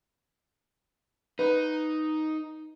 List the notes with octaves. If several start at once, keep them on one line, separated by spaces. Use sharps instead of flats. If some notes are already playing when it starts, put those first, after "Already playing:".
D#4 B4